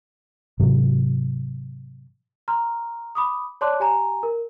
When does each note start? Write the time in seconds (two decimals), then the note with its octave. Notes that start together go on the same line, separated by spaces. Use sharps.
0.60 G#2 C3 E3 F#3
2.48 A#5 C6 F6
3.15 B5 D6 D#6
3.61 C#5 D5 A5 C6 D6 F#6
3.80 G4 G#5 A#5
4.23 A#4